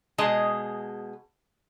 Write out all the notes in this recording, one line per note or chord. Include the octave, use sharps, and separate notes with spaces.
B2 G#3 G#4 D#5 A5